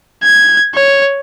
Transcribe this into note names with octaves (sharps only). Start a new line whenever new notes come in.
G#6
C#5